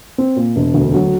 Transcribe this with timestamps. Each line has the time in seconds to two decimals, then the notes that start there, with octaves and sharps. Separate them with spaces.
0.18 C4
0.36 A#2
0.56 E1
0.74 D2
0.94 F#3